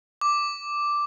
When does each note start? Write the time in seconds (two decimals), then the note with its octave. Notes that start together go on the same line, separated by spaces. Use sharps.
0.21 D6